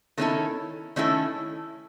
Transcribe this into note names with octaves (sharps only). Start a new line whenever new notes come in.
D#3 A3 C#4 E4 A4
D#3 A3 C#4 E4 A4